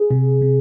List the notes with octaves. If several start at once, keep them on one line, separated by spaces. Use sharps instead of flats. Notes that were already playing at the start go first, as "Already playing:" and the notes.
Already playing: G#4
C3
C3